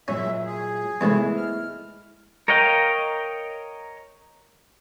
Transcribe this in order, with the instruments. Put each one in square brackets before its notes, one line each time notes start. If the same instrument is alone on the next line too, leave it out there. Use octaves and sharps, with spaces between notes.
[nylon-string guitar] A#2 F#3 [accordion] G#3 E5 [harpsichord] C#4
[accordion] G#4
[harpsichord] E2 C3 A3 [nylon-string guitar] G#3 B3 E4
[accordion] F6
[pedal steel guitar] A#4 C#5 D#5 F5 G5